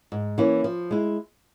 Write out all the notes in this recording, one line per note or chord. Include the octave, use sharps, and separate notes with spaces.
G#2
E3 A#3 C#4 E4
F3
G#3 E4